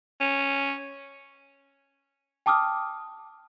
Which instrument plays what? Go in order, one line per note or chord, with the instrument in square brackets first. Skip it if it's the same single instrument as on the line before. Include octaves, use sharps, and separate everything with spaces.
[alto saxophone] C#4
[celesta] G5 A5 D6 D#6 F6